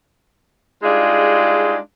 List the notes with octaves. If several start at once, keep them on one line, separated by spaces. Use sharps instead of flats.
G3 G#3 D4 D#4 F4 G#4